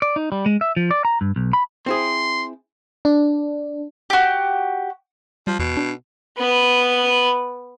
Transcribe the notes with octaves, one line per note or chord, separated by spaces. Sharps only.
D5
D#4
G3
G#3
E5
F3
D5
A#5
G2
B1
B5
C4 E4 G#4 C6
D4
F#4 G4
F3 G3
E2 B2
D4
B3 B4